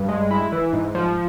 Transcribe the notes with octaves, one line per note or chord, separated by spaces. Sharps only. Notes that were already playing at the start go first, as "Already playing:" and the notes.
Already playing: G2
G#3
E4
E3
G#2
F3